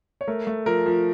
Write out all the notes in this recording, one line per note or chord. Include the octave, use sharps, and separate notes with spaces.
C#5
A3 A#4
A3
F3 A#4
F3